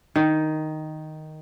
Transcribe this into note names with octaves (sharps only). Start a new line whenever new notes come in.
D#3